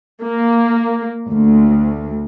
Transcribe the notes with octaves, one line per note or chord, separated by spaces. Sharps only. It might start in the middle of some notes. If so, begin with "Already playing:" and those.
A#3
D2